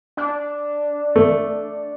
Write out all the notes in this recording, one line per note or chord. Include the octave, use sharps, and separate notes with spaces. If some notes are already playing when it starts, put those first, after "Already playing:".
D4
A3